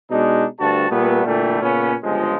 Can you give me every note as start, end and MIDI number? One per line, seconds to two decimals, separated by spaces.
0.11 0.45 47
0.11 0.45 56
0.11 0.45 62
0.11 0.45 63
0.59 0.90 38
0.59 0.90 43
0.59 0.90 66
0.59 0.90 81
0.90 1.23 46
0.90 1.23 55
0.90 1.23 57
0.90 1.23 59
1.26 1.59 46
1.26 1.59 50
1.26 1.59 52
1.26 1.59 55
1.26 1.59 57
1.62 1.95 46
1.62 1.95 49
1.62 1.95 59
1.62 1.95 61
2.03 2.38 31
2.03 2.38 37
2.03 2.38 53
2.03 2.38 56